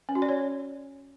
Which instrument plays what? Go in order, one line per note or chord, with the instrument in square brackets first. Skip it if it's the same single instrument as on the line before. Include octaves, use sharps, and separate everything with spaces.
[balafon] C#4
F#4
D5
C#5